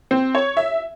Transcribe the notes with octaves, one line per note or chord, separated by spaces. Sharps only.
C4
C#5
E5